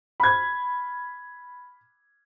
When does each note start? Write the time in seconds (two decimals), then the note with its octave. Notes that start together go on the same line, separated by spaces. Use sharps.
0.20 B5 G#6